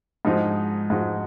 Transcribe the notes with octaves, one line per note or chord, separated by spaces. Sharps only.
G#2 F3 G#3 D#4 F#4
G#2 F3 G#3 D#4 F#4